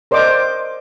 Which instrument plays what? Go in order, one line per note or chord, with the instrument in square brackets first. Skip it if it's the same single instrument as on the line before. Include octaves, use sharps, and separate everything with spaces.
[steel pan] A#4 C5 D5 D#5 D6